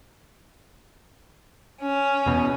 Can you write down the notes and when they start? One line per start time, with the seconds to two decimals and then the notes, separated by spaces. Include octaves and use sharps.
1.81 C#4
2.26 E2 B2